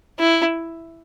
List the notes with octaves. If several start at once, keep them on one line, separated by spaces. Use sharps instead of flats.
E4